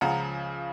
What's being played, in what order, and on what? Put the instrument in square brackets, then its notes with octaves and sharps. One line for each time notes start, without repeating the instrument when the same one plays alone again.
[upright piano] C#2 C#3 F3 F#5 A#5